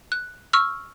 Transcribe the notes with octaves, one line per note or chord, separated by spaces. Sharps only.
F#6
C#6 E6 F6